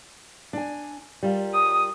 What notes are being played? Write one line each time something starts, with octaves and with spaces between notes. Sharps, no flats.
D4 G#5
G3 F4 A#4
D#6